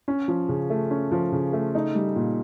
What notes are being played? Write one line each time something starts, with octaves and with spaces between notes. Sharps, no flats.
C#4
F3
C#3
A3
C#4
F3
C#3
A3
D#4
G3
A#2